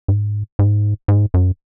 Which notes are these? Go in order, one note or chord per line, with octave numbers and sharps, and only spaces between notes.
G#2
G#2
G#2
F#2